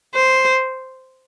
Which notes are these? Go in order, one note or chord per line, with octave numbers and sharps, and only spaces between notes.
C5